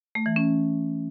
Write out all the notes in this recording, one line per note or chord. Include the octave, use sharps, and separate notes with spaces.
A3
E3
C#4